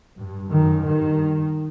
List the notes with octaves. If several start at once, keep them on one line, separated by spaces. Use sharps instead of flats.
G2
F#2 D#3
G2 D#3